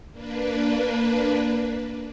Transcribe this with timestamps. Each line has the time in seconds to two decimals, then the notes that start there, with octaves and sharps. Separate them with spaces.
0.11 A#3 D4 B4